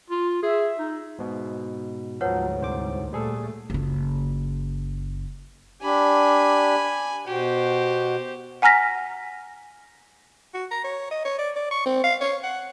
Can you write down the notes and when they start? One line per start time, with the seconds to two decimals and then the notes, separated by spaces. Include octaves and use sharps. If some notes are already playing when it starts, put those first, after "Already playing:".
0.10 F4
0.43 G#4 E5
0.79 D#4
1.19 G#2 B2
2.21 D2 G#2 F3 F#3 B4 C#5 F#5
2.61 C2 C5 D6
3.13 A#2 G3 A3 G#4 A4
3.70 F#1 F4
5.82 D4 G4 G#5 B5
7.27 B2 F#4 G4 C5
8.62 F#5 G#5 A#5 F6 A#6 B6
10.54 F#4
10.71 A#5
10.84 C#5
11.11 D#5
11.25 C#5
11.39 D5
11.56 D5
11.71 C#6
11.86 C4
12.04 F5
12.21 C#5
12.43 F#5